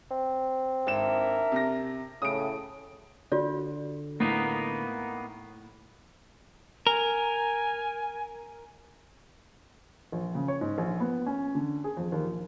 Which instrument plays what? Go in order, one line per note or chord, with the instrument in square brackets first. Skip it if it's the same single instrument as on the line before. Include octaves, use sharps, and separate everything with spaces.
[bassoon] C4
[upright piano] G#1 E7 [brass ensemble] D4 A#4 E5
[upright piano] C3 A#6
[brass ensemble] A2 [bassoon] C#3 [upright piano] D#6 D7
[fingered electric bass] D3 [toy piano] F4 F#4 D5
[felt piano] A2 [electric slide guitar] A#3 B3 D#4
[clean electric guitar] A#4 [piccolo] G#5
[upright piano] A#1
C#3
C#5
G#2
A#1
B3
C#4
D3
G#4
F2
D#2
A#1